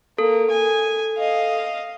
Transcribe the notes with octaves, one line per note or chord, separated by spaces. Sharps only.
A#3 A4
G#5
D#5 F5